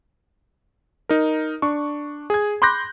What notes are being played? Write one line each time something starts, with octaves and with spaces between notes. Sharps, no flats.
D#4 A#4
D4 C#6
G#4 G#6
B5 C6 D6 F#6 G6 A#6